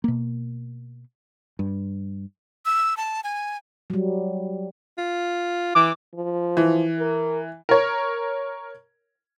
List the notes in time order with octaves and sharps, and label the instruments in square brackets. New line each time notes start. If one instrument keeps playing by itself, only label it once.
[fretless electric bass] B2 A#3
G2
[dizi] E6
A5
G#5
[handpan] F#3 G3
[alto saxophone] F4
[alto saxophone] E3 [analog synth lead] D6
[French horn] F3
[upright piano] E3
[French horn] A#4
[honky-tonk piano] A#4 C#5